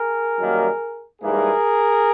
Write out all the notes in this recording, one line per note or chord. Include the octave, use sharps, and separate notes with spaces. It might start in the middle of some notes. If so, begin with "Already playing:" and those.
Already playing: G#4 A#4
F#2 D#3 G3 A#3
G#2 E3 G3 A#3 G#4 A#4